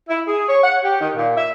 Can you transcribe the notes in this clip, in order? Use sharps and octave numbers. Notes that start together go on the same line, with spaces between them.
E4
G#4
C#5
F#5
G4
D#3
A#2
E5